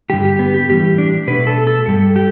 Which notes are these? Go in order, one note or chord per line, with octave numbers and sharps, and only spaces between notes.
G2 D3 G3 G4
G4
B3
G4
A2 E3 G3 G4
D4
B2 A3 B4
A4
A4
G2 G3 A4
G4